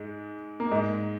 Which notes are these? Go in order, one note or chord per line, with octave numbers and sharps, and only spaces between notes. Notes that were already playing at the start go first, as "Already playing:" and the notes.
Already playing: G#2 G#3
A#3
G#2 G#3